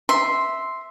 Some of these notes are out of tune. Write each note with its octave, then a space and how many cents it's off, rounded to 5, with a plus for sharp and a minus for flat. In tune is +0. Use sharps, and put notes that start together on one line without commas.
E5 -5 C6 +0